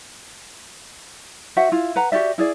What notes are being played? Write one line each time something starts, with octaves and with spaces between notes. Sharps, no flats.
F#4 C5 E5 F#5
E4 F4
B4 F#5 A#5
F#4 G4 D5 E5
E4 G#4 D5